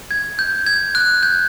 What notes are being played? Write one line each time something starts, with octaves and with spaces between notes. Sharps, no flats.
G#6
G6
G#6
F#6
G6